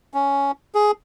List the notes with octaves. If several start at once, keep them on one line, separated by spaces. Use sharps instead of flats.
C#4
G#4